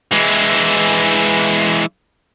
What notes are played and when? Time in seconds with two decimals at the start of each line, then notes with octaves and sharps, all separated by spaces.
0.11 E3 G#3